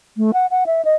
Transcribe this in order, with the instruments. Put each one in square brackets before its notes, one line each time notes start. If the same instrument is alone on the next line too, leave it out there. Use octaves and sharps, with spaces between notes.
[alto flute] A3
F#5
F#5
E5
D#5